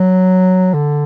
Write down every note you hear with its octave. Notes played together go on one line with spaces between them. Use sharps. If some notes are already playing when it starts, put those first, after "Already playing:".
Already playing: F#3
D3